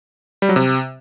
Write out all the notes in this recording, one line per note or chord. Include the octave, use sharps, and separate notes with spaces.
G3
F#3
C3